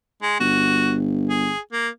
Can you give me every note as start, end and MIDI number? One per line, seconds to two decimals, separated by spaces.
0.22 0.36 56
0.40 1.51 31
0.40 0.94 66
1.30 1.59 68
1.72 1.88 58